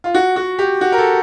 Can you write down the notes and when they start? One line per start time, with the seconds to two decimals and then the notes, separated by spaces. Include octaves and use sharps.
0.04 F4
0.14 F#4
0.36 F#4
0.59 G4
0.81 F#4
0.92 A#4
0.98 A4